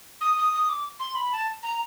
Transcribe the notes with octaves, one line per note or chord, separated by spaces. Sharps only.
D#6
D#6
D#6
D6
C6
B5
A5
A#5